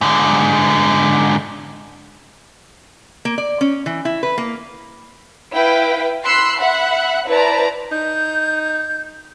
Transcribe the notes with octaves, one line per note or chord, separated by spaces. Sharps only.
G#2 D3
A#3
D5
C#4
E3
E4
B4
A#3
E4 B4 F5 G5 B6 D7
B5 C6 E6 F#6 C7 C#7
E5 F#5 B5 F#6 C#7
E4 B4 C5 D5 A5 A#5
D#4 G6